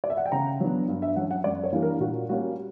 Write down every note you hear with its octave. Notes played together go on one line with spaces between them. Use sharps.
D5
E5
F#5
G5
C#3 A#5
F#3 B3 D4
G2
E5
F#3 C#4 F#5
F#5
F#2 D5
C#5
E3 G3 A#3 D4
A#4
A#2 F#4
G3 A#3 C#4 F#4